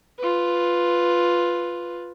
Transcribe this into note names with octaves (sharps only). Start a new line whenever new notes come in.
F4 B4